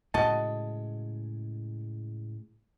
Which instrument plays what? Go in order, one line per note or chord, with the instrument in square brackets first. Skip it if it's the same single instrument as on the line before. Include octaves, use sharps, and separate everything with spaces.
[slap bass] A2 C#3 G#3 [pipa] F#4 D#5 A5